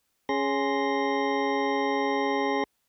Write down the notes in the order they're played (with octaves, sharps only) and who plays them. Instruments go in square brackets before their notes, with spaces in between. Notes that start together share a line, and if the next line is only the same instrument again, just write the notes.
[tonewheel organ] C#4 G#4 C6 A#6